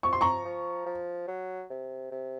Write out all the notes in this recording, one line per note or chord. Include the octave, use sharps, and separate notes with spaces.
F3 C#6
C6
A#5 C#6
F3
F3
F#3
C3
C3